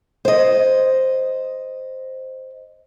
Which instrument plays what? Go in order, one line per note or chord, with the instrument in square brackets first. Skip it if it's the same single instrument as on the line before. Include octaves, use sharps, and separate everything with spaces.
[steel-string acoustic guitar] C5 D#5